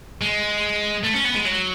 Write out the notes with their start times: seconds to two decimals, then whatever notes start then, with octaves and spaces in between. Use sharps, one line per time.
0.21 G#3
1.03 A3
1.14 C#4
1.25 B3
1.35 G#3
1.45 F#3